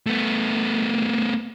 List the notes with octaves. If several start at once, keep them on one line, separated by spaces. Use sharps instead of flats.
A3 B3